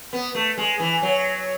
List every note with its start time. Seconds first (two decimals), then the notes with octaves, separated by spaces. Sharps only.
0.13 B3
0.35 A3
0.58 G#3
0.79 E3
1.02 F#3